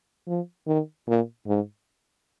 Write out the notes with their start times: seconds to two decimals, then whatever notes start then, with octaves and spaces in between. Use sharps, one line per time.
0.27 F3
0.67 D#3
1.07 A#2
1.47 G#2